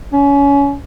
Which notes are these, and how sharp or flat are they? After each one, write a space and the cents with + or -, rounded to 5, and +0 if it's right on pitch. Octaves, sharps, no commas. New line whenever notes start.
C#4 +25